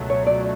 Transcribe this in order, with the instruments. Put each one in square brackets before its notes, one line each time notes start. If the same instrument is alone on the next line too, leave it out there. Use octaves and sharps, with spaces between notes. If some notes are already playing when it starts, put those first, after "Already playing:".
Already playing: [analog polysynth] C#2 B2 F#3 A3
[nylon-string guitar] C#5
D5